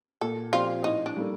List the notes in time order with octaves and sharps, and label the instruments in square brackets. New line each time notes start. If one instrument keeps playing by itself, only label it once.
[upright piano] A#2 [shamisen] A4
[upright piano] F3 C4 G4 D5 [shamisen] F4
[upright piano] A2 [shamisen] D#4
[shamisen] D4
[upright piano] G3 A#3 D#4 A4